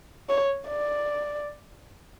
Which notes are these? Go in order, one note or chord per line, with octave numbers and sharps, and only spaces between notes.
C#5
D5